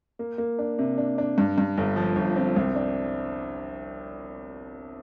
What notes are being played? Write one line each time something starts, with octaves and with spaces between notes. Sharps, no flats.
A#3
A#3
D4
C3
D4
D4
G2
G2
G1
F3
G1
C4
C2
D4